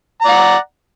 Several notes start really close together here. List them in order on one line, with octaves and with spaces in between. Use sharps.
A#5 D5 F#5